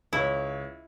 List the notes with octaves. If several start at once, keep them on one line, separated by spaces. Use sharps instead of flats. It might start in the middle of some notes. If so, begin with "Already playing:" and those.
C#2 E4 C#5